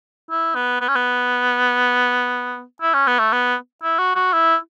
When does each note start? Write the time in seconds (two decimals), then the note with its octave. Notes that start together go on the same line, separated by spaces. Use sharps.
0.31 E4
0.55 B3
0.81 B3
0.88 C#4
0.95 B3
2.82 E4
2.94 C#4
3.07 B3
3.19 A3
3.33 B3
3.83 E4
3.99 F#4
4.15 F#4
4.33 E4